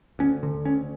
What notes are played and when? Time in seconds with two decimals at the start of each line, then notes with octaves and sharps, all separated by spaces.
0.19 D2 C#4
0.43 D3
0.65 D2 C#4